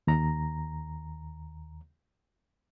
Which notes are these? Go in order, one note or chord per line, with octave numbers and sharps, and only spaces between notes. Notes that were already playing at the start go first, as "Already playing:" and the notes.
D#2 A#5